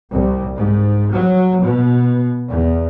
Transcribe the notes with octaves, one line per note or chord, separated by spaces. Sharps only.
C2
G#2
F#3
B2
E2